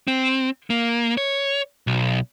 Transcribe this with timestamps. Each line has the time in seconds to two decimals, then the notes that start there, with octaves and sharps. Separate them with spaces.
0.08 C4
0.70 A#3
1.17 C#5
1.87 B1